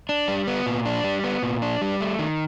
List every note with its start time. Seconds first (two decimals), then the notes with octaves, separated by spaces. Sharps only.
0.09 D4
0.28 G3
0.47 B3
0.66 A#2
0.86 D4
1.04 G3
1.24 B3
1.43 A#2
1.62 D4
1.82 G3
2.00 A3
2.19 D#3